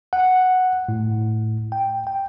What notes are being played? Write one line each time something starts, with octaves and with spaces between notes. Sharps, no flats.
F#5
A2
G5
G5